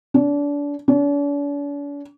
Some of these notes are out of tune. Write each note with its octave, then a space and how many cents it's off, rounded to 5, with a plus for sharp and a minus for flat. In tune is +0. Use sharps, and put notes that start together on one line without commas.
D4 -30
D4 -45